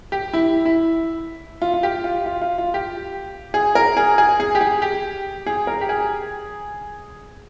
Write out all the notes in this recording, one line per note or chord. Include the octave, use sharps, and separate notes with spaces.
G4
E4
E4
F4
F4
G4
F4
F4
F4
F4
G4
G#4
A#4
G#4
G#4
G#4
G4
G#4
G4
G#4
A#4
G4
G#4